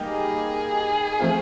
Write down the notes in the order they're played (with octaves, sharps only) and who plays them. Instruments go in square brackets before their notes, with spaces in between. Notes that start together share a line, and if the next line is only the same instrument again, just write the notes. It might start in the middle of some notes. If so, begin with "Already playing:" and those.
Already playing: [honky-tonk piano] G3 A#3 D#4 G4
[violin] G#4
[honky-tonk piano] F3 A3 C4 F4